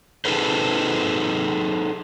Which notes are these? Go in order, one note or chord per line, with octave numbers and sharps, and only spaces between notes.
D#4 G#4 A4 B4 C5